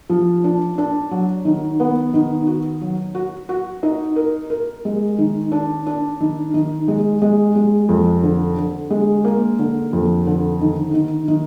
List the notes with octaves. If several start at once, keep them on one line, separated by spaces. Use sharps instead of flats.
F3
D4
D4
F#3
D#3
B3
D#3
F#4
F#3
F#4
F#4
D#4
A#4
A#4
G#3
D#3
D4
D4
D#3
D#3
G#3
G#3
G#3
F2
D3
D3
G#3
A#3
D3
F2
D3
D#3
D#3
D#3